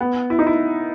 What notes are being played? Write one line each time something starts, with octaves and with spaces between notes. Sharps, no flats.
B3
E4
D#4
E4